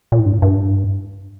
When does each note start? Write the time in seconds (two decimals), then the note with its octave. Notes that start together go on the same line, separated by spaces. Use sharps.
0.12 A#2
0.19 A2
0.26 G2
0.33 A2
0.42 G2